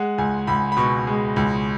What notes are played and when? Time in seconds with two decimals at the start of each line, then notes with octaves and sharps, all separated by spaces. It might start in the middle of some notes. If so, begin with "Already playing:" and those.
Already playing: G#3 F#5
0.18 C#2 G#5
0.47 C#2 B5
0.72 B5
0.77 B2 C#6
1.07 G#3
1.36 C#2